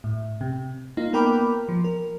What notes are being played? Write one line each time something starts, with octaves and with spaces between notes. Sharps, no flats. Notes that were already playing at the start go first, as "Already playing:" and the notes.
A2
C3
A#3 D#4 F4
A#3 B3 A#4 G5 B5 D6
F3
A#4